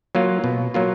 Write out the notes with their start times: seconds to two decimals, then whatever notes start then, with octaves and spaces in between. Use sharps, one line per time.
0.15 F#3 A#3 F4
0.44 B2
0.74 F#3 A#3 F4